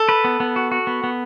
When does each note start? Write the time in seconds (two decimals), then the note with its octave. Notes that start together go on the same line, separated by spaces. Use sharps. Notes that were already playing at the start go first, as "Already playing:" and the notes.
Already playing: A4
0.09 B4
0.24 B3
0.40 B3
0.56 F#4
0.72 F#4
0.87 B3
1.04 B3